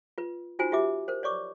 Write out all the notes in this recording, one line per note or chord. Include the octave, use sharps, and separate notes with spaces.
F4 B4
D#4 F4 F#4 C5 G#5
F4 G4 E5 D6
A#4 C5
C#5 D5 C#6 D6